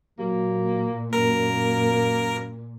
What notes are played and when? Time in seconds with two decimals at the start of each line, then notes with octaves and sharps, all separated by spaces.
0.19 A#2 F#3 A#3
1.13 F#2 A#3 A#4